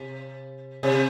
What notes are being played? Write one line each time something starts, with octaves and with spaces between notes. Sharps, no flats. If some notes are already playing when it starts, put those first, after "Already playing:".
Already playing: C3
C3